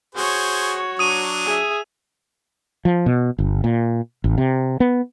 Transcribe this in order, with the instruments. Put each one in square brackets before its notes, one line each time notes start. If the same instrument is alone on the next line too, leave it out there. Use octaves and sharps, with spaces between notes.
[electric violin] F#4 C#5 [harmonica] G#4 C5
[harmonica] F#3 D4 [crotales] D#6 D#7
[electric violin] G#4 E5
[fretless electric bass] F3
B2
G1
A#2
A1
C3
B3